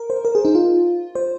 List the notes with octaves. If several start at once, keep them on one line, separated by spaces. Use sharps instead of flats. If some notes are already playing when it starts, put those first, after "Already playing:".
Already playing: A#4
C5
A#4
G#4
D#4
F4
C5